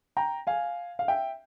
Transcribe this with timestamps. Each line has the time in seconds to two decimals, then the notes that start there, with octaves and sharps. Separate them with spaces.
0.17 G5 A#5
0.47 F5 G#5
0.99 F5
1.08 E5 G5